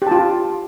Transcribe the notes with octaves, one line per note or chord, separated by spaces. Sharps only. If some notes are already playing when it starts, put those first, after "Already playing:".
F4 G4 A5